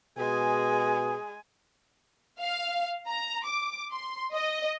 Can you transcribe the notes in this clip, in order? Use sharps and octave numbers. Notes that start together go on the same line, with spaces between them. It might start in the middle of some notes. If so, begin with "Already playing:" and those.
B2 G#3 G#4 G#5
F5
A#5
D6
C6
D#5